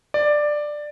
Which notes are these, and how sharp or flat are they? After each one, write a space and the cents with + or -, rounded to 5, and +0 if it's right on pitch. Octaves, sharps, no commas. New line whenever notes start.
D5 +10